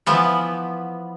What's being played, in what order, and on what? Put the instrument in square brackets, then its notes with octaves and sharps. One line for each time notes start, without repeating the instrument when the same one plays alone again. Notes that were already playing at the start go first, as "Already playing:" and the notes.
[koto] E3 F3 B3